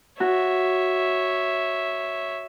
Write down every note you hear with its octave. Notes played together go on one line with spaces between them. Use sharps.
F#4 C#5 E5